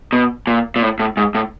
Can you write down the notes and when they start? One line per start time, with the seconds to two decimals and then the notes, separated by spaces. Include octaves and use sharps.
0.13 B2
0.47 A#2
0.76 A#2
0.83 A2
0.99 A2
1.17 G#2
1.35 A2